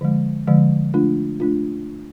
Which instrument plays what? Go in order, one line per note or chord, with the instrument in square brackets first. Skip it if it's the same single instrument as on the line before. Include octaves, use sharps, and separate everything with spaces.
[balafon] D3 F3 G#3
D3 F3 G#3
A3 D4 F4
A3 D4 F4